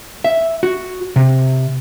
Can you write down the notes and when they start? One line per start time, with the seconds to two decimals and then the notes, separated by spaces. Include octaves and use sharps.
0.24 E5
0.63 F#4
1.16 C3